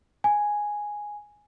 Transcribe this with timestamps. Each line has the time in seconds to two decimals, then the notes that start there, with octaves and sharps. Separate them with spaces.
0.24 G#5